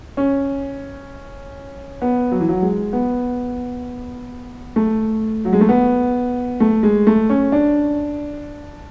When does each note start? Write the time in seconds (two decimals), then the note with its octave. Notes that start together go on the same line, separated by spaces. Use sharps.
0.17 C#4
2.02 B3
2.32 F#3
2.40 E3
2.49 F#3
2.62 G#3
2.93 B3
4.76 A3
5.45 F#3
5.53 G#3
5.61 A3
5.69 B3
6.60 A3
6.83 G#3
7.07 A3
7.30 C#4
7.52 D4